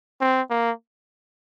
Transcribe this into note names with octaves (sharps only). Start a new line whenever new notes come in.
C4
A#3